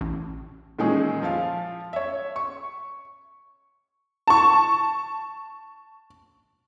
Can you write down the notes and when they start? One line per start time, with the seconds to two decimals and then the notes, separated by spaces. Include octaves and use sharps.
0.01 A1
0.79 A#2 D#3 E3 G#3 C#4 G#4
1.23 F3 F4 F5
1.93 C#5 E5
2.36 C#6
4.27 A5 C#6